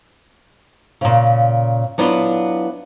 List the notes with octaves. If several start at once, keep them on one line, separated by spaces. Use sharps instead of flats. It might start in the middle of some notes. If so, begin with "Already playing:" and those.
A#2 C#3
F#3 B3 D4 E4 F4